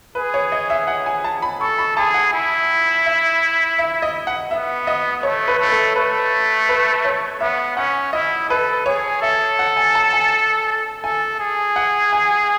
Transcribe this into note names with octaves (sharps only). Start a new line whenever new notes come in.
G#4 B4
C#5
D#5
E5
F#5
G#5
A5
B5
A4 C#6
B5
G#4 A5
F#5
E4
E5
E5
D#5
F#5
B3 E5
D#5
A3 C#5
B4
A3
A4
A3 B4
B4
C#5
B3 E5
C#4 F#5
E4 D#5
A4 B4
G#4 C#5
A4 E5
F#5
G#5
A5
G#5
A4 G#5
G#4
F#5
G#5